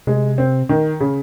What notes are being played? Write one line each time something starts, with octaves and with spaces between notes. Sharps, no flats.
C3 G#3
C4
D#3
C#3